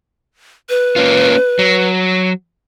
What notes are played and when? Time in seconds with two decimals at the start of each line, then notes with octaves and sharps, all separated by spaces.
0.69 B4
0.96 A#3 C#4 F4
1.59 F#3